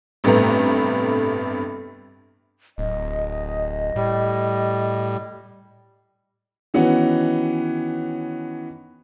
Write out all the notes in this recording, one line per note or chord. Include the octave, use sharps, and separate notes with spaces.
A1 G2 C3 A3 B3 A#5
D1 D#5
A2 G3
D#3 E3 B3 C#4 F#4 F#5